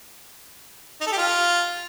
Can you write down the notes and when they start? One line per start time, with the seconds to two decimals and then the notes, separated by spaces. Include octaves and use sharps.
1.01 D#4
1.07 A4
1.12 G4
1.18 F4